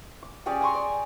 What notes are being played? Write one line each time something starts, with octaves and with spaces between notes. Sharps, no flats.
D6
C#4 G4 G#4 D5
G#5 A#5 C6 C#6
D5